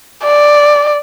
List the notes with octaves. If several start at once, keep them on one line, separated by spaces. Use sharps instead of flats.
D5